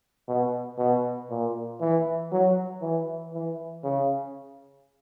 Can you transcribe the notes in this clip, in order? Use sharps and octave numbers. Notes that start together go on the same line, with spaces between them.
B2
B2
A#2
E3
F#3
E3
E3
C#3